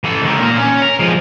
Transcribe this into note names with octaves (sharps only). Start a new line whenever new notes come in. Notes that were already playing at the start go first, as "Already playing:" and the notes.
E3 A4
C#2 D#3
A#2 A#4
C#4
A#4
F3 G#3